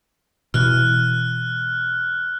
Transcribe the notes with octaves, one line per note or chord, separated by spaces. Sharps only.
B2 E3 F6 F#6